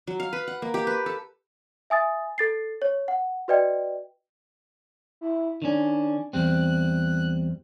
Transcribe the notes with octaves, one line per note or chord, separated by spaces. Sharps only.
F#3
F5
B4
F#5
A#3
G4
B4
A4
E5 G#5 D#6 A6
A4 A6 C7
C#5
F#5
F#4 B4 D5 D#5 G5
E4
D#3 C#4 D4
E2 G3 C4 F#6